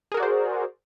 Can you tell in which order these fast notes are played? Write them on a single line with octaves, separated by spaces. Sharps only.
G#4 A#4 F#4 D5 C5